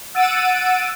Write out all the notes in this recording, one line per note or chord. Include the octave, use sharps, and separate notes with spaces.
F#5 E6 A6 D7 D#7